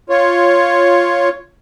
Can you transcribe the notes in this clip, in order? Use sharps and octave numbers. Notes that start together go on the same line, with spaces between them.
F4 C#5